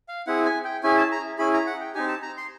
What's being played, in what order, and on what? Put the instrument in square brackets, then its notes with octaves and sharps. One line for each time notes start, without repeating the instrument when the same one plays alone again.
[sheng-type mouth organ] F5
C4 E4 G#4 F#5
G#5
G5
C#4 E4 G#4 G#5
A5
A#5
C#4 E4 G#4 B5
A#5
F#5
G5
C4 D#4 G4 G#5
A5
A#5
C6